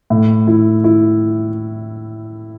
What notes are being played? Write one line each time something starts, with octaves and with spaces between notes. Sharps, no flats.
A2
E4
E4